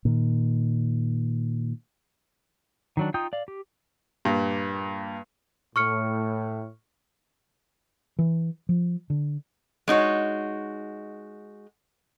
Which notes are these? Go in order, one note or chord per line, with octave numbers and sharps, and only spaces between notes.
A#2 D#3
D#3 F#3 D4
D#4 F4 G5 D#6 G6
D5 F5
G4
G2 A#2
A2 C#6 F6 C#7
E3
F3
D3
G#3 D#4 F#4 C#5